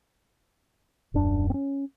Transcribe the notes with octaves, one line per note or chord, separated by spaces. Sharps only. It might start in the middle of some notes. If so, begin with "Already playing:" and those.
D#1 F#2 D4
C4 C#4